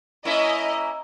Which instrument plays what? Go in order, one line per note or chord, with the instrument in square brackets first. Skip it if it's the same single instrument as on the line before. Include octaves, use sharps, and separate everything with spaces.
[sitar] A#3 C#4 E4 [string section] D#5